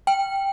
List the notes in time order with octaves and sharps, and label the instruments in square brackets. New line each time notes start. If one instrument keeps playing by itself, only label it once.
[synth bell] G5